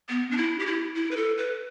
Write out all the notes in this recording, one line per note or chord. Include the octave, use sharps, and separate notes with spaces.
B3
D4
E4
G4
E4
E4
B4
A4
B4